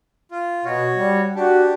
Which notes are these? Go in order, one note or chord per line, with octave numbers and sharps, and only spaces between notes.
F4
B2 F#4 C#5
G3
D4 F#4 G4